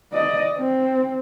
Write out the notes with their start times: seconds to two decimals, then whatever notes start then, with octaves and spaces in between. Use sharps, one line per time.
0.12 D5 D#5
0.57 C4